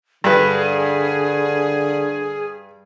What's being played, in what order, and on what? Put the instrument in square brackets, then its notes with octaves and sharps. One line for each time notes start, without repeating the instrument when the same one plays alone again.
[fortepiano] G2 B4 [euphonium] D3 [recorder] G#4